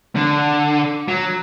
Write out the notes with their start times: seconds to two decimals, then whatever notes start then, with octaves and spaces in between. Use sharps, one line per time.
0.16 D3
1.08 F#3